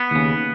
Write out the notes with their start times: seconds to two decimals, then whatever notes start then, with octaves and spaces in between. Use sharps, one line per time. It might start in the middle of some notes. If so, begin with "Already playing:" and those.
Already playing: B3
0.11 D#2 C#3